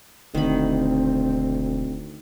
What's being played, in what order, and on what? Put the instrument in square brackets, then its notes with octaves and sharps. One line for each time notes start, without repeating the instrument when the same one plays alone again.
[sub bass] E1 [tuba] D2 [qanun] D#3 B5 [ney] C4